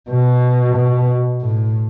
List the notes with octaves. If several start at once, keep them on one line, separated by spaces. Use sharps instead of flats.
B2
B2
A2